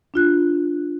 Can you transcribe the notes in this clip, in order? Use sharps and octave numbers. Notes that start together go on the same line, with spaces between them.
D4 F4 F#6